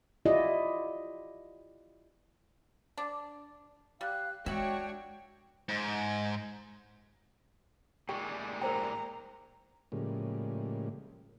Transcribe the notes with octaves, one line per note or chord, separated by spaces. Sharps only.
E4 F4 G4 D5 D#5
D4
G3 F5 F#6
G#3 D4 F#4 C#5 E5 F#5 G5
G#2
A#2 G3 G#3 G#4 G5 C#6
A#4 C5 G5 A#5
A2 C#3 F3 G3 G#3 A#3